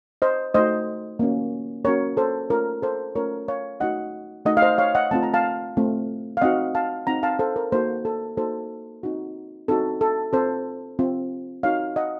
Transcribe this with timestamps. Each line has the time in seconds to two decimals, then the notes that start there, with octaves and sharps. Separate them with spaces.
0.22 C5 D#5
0.54 A3 D#4 F#4 C5 D#5
1.19 A#3 C#4 F#4
1.85 A#3 C#4 F#4 A#4 C#5
2.17 A4 C5
2.50 A3 C#4 F4 A#4 C#5
2.82 A4 C5
3.15 A3 C#4 F4 A#4 C#5
3.48 C#5 F5
3.80 A3 D#4 F#4 D#5 F#5
4.45 A3 D#4 F#4 D#5 F#5
4.57 F5
4.62 C5 D#5
4.78 C#5 F5
4.95 D#5 F#5
5.11 A3 C4 F4 A5
5.23 A#5
5.34 F5 A5
5.77 A3 C4 F4
6.37 F5
6.41 C4 D#4 F#4 D#5 F#5
6.75 F5 A5
7.07 C4 D#4 F#4 F#5 A#5
7.23 F5 A5
7.39 A4 C5
7.56 A#4
7.72 A#3 D#4 F#4 A4 C5
8.05 A4
8.37 A#3 D#4 F#4 A4 C5
9.03 C4 D#4 F#4
9.68 C4 D#4 F#4 A4
10.01 A4
10.33 C4 F4 A4 C5
10.99 C4 F4
11.63 C4 D#4 F#4 C#5 F5
11.96 D#5 F#5